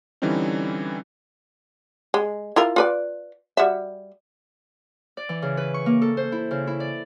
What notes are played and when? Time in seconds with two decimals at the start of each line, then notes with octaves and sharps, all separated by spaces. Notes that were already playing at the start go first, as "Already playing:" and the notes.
0.22 D3 E3 G3 C4 C#4 D#4
2.14 G#3
2.56 E4 F4 A#4
2.76 F4 B4 D5
3.57 G3 F#4 E5
5.17 D5
5.29 E3
5.42 C#3
5.57 B4
5.74 C#6
5.86 A#3
6.02 A4
6.17 C5
6.32 E4
6.51 C#3
6.67 E4
6.80 D5